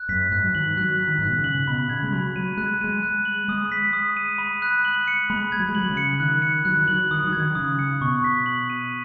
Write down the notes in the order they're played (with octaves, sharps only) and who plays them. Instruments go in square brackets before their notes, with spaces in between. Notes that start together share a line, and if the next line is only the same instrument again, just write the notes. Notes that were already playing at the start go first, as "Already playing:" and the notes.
Already playing: [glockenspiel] F#6
[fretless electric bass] F#2 [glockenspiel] B6
[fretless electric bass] G#2 [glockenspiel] F#6
[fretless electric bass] F#3
[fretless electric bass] D#3 [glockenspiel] F#7
[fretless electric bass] F#3 [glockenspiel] F#6
[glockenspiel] B6
[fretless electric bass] D#3
G#2
[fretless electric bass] B2 [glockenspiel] F#6
[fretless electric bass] C#3
[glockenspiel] F#7
[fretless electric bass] B2 [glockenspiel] B5
[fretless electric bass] C#3 [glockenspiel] G#6
[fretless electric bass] G#3
[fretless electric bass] F#3 [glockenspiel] B5
[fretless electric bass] F#3 [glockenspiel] D#7
[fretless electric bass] G#3 [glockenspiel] F#6
[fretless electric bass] G#3 [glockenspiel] D#7
[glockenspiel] F#6
F#7
[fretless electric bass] G#3 [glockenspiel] D#6
[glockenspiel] B6
D#6
D#7
B5
F#6
F#7
C#7
[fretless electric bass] G#3 [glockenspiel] B5
[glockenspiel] G#6
[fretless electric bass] F#3
G#3
[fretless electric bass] F#3 [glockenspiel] F#7
[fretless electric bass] C#3
[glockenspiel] C#7
[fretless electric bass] D#3 [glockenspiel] F#6
[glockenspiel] C#7
[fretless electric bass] F#3 [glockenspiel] F#6
[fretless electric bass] D#3
[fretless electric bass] F#3 [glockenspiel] F#7
[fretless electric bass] D#3 [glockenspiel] D#6
[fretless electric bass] F#3
[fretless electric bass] D#3 [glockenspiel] G#6
[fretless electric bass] C#3 [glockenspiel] D#6
[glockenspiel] C#7
[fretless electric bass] B2 [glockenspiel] C#6
[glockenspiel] B6
F#7
D#7